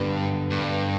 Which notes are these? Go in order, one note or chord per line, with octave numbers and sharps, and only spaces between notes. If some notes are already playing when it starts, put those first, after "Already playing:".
Already playing: G2 D3 G3 B3
G2